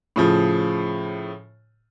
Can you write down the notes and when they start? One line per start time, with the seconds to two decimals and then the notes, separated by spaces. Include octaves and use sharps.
0.16 A2 C#3 F3